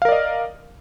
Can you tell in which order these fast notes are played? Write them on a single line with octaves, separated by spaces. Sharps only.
F5 A#4 D5 D#5